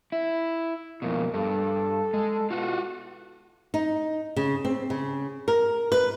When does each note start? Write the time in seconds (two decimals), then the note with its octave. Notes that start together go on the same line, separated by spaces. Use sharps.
0.12 E4
1.02 F2 B2 A#3
1.34 G2 A4
2.14 G#3
2.50 B2 F4 F#4
3.74 D#4
4.36 C#3
4.65 C4
4.90 C#3
5.48 A#4
5.92 B4